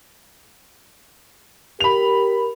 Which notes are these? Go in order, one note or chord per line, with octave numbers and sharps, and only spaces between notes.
G4 A#4 B5 F7